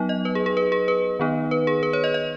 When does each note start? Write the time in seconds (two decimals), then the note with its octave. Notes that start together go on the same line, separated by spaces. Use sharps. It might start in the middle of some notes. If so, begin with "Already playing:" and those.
Already playing: F#3 B3 D#4
0.09 D#5
0.25 B4
0.35 G#4
0.46 G#4
0.57 B4
0.72 G#4
0.88 B4
1.19 D#3 B3 D#4
1.51 B4
1.67 G#4
1.83 B4
1.93 C#5
2.04 D#5
2.14 D#5